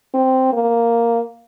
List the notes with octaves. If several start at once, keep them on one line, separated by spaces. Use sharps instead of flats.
C4
A#3